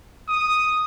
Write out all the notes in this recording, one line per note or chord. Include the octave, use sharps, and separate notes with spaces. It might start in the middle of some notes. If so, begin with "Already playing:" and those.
D#6